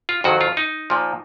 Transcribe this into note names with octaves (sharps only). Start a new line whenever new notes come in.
F4
F2 D#3 F#3 F#4
F4
D#4
A#2 F3